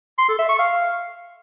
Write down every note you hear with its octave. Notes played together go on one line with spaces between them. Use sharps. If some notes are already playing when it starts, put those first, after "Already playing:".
C6
A4
E5
C#6
F5